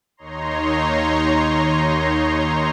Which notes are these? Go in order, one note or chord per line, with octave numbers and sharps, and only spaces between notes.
D#2 D#4 C#5 A#5 C6